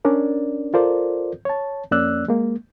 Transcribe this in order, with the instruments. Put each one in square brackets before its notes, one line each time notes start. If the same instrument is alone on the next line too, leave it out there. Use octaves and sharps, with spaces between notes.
[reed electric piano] C#4 D4 A#4 D5
F4 A4 A#4 C5 D5
C#5 A5
F2 A#3 C#4 D5 E6 F#6
G#3 A#3